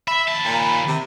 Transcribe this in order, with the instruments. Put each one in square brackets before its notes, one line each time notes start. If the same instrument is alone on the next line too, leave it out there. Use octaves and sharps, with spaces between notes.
[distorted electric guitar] E5 [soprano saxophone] B5
[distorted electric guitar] D#2 A5
[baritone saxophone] A#2
C3